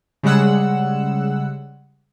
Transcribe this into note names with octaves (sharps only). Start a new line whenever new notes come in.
C#3 G3 G#3 F#5 E6